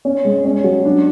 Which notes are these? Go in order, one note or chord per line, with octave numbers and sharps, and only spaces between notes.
C#4
G#3
C#4
F#3
D4